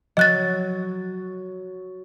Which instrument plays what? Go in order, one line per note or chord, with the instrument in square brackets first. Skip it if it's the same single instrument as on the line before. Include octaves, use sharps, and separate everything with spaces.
[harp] F#3 [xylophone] D#5 F#6 A6